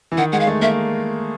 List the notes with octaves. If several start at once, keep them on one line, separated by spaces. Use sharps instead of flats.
E3
D#3 F#5
G#3 F#5
F5
A3
A#3 E5